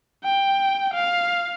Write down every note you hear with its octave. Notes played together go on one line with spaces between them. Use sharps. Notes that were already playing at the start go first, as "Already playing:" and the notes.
G5
F5